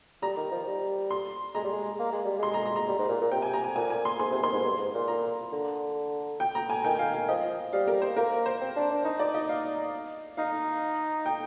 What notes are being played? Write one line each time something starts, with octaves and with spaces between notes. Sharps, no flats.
G3 A#5
D#3
F3
G3
C6
G#3 A#5
G3
G#3
A#3
G#3
G3
G#3 C6
A#5
A#5
A#5
G3
G#2
A#2
A#2
C3 G5
G#5
A#5
G#5
A#2 G#5
G#5
C6
G#2 C6
C3
D#3 C6
G#2
G2
G#2
A#2
A#5
D3
G5
A#5
G#5
D#3 G5
F5
F5
F3 D#5
G3 F5
A#4
C5
A#3 A#4
C5
C4
D4
D4
D#4
D5
D#5
F5
D#4 F5
G5